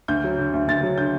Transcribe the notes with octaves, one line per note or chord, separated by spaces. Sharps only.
D2 G6
F#3
D3
D2
D2 A6
F#3
D3 G6